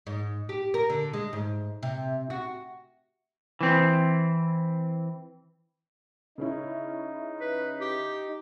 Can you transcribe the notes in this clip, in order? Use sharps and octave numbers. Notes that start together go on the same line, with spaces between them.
G#2
G4
A#4
D3
G#3
G#2
C3
F#4
E3 C4
C#3 C#4 D#4 E4
B4
G4